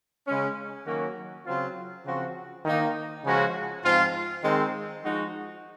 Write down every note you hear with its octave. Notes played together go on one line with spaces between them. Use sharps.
C#3 G#3 C#4
D#3 F#3 A#3 C#4 F#4
C#3 F#3 C4 F4
C#3 F3 C4 F#4
D#3 A#3 D#4
C#3 F3 G#3 C#4 F#4
G#2 F3 C4 F4
D#3 G#3 C4
F3 G#3 D#4 F#4